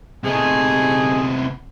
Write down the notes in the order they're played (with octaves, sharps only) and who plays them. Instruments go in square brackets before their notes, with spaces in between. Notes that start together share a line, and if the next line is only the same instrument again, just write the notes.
[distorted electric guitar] C3 B3 [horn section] A3 D#4 G#4